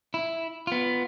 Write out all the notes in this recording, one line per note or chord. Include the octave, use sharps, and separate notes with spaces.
E4
B3 F4